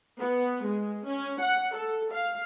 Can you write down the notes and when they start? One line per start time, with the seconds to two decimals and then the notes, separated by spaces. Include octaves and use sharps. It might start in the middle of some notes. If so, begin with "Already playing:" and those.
0.20 B3
0.66 G#3
1.08 C#4
1.42 F#5
1.76 A4
2.12 F5